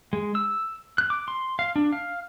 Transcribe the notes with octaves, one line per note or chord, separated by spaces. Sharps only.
G#3
E6
F#6
D6
C6
F5
D4
F5